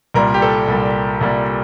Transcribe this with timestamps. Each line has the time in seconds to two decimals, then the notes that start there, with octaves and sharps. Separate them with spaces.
0.14 C2 A#2 G3 A#4
0.34 G4
0.42 A4
0.68 C2 A#2 G3
1.21 C2 A#2 G3